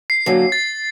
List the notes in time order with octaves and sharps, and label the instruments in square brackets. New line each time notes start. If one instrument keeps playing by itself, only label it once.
[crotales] C7
[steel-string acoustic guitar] F#2 D3 F#3 A#3 [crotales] C7
[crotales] A6